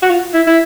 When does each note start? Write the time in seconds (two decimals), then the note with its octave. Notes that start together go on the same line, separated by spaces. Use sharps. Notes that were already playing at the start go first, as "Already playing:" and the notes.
0.02 F#4
0.10 F4
0.34 E4
0.47 E4